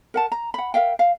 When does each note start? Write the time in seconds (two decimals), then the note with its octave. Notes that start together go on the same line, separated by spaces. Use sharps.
0.14 A#4 F#5 A5
0.32 A#5
0.54 F#5 B5
0.74 A#4 E5 F5 G5
0.99 F5